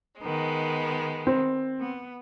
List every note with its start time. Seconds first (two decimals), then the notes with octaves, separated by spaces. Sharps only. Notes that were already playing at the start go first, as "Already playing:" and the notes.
0.22 D#3 G#3 B3
1.27 C4
1.80 B3